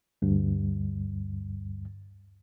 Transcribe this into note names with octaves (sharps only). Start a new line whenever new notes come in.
D2 G2